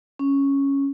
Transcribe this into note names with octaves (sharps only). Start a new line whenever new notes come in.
C#4